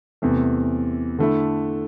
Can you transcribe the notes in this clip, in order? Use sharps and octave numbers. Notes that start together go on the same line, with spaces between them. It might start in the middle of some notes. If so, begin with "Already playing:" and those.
E2 C3 E3 A3
D3 A3 E4